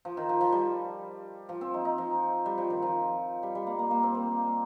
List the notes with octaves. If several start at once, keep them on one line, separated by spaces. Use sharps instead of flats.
F3
D#3
F3
F3
G3
F3
C4
D#4
D#4
F3
G3
F3
D#3
F3
G3
G3
A#3
A#3
A#3
C4
A#3